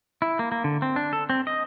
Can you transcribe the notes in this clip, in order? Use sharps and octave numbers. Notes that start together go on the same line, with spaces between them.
E4
A#3
A#3
D3
C4
D4
A4
C4
D#5